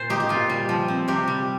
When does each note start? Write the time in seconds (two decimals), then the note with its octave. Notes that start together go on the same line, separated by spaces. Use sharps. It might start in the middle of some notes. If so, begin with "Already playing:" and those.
Already playing: A#2 C5
0.10 D#4 G4
0.20 G4
0.29 A#2 F4
0.49 G3
0.69 F3
0.88 C4
1.08 C3 G4
1.28 G3